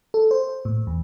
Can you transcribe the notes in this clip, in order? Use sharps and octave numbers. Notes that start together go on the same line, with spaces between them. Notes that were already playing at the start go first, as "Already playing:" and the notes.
A4
C5
A2
E2